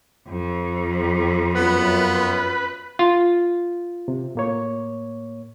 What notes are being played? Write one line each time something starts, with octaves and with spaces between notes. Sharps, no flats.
F2
F#2 B3 F4 B4
F4
C3
A2 A#3 C#5